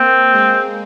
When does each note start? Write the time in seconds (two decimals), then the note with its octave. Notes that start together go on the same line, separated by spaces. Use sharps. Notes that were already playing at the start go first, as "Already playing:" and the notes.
Already playing: A#3 C4
0.33 G#3